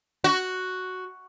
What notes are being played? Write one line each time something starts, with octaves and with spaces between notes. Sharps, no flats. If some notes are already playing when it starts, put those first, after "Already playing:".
F#4